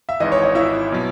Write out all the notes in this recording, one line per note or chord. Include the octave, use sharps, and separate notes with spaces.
E5
G#1 G#2 E3 D#5
C#5
D#5
E4 E5
B2 F#3